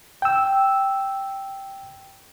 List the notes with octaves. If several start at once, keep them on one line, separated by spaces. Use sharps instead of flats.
G5 E6